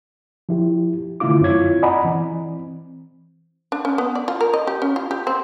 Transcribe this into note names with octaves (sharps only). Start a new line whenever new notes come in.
F3 E4 G4
D3 D#3 A3 E4 F4 D6
F#2 C4 E4 F4 C#5 G#6
D5 D#5 F#5 G#5 A#5 B5
E3 C4
D4
C#4
B3
D5
F4
A#4
D#5
G4
C#4
F4
G4
C4